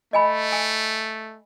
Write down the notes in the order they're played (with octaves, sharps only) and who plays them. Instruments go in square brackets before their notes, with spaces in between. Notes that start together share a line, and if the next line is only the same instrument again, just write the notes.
[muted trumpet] A3 [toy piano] D#5 G#5 B5
[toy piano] G#5